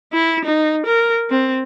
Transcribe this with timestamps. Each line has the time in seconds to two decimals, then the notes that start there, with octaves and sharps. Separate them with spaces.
0.13 E4
0.45 D#4
0.86 A#4
1.30 C4